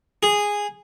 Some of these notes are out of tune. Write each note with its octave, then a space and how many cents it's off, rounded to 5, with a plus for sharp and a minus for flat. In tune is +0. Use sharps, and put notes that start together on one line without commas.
G#4 -10